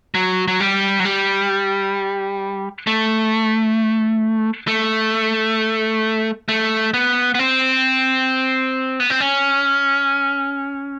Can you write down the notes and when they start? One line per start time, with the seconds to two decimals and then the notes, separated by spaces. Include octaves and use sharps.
0.14 F#3
0.48 F#3
0.60 G3
1.00 F#3
1.05 G3
2.87 A3
4.67 A3
6.48 A3
6.94 B3
7.35 B3
7.39 C4
9.00 B3
9.10 C4
9.21 C#4